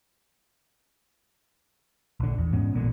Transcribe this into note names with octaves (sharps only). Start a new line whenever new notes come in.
A#1 D3
E2
G#2 G#3 B3 C#4
E1 A1 A#2 D3